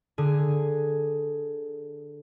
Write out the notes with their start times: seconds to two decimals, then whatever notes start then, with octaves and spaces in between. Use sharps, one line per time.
0.18 D3 G#4